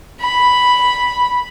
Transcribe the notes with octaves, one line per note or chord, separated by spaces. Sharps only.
B5